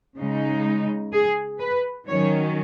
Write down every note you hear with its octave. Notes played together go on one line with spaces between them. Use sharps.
C#3 G#3 D#4
G#4
B4
D#3 F#3 C#4 C#5